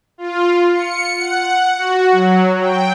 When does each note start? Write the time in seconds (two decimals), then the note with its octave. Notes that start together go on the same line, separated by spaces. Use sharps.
0.18 F4
0.74 C#7
1.18 F#5
1.78 F#4
2.12 F#3
2.59 G5